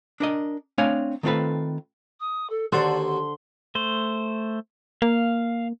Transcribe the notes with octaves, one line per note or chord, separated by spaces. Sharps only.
D4 A#4 D#5
A3 C4 D4 C#5 F5 G#5
D#3 A3 C4 F4 A4 B4
D#6
A4
D#2 D3 F#4 A4 C5 D5 F#5
C6
A3 C5
A#3 F5